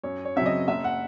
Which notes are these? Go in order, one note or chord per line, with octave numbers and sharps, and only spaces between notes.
F#2 C#5
C#5
C#3 F#3 C4 E5
D#5
F#1 E5
F#5